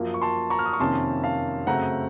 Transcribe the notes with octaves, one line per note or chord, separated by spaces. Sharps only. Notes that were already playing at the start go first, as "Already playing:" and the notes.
Already playing: F#2 F3 A#3 F4
C#6
A5 C6
A#5 C#6
F6
D#6
C#6
F2 C3 D#3 A#3 C#4 A5 C6
F5 A5
F#2 C#3 A3 C4 F#5 A#5